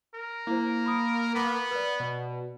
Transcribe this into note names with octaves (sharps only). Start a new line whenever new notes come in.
A#4
A#3 E4 C5
B5 D#6
B3 B5 D6 B6
B4 D5
B2